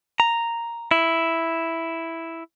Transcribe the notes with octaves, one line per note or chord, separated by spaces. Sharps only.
A#5
E4